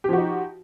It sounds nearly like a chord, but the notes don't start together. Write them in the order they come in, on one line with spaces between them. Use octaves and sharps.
G4 F3 F#4 D#4